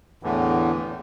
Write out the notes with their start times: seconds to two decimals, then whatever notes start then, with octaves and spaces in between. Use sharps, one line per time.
0.23 E2 A2 D3 E3